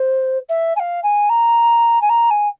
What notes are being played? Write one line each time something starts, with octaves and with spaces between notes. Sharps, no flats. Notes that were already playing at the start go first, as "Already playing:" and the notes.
Already playing: C5
E5
G#5
F5
G#5
A#5
G#5
A#5
G#5